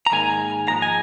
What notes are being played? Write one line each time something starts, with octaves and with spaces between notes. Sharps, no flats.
A#5
G#2 D#3 A#3 G#5
G#2 F3 G#3 A#5
G#5